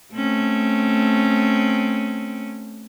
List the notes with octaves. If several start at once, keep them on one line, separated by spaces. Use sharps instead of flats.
A3 C4 C#4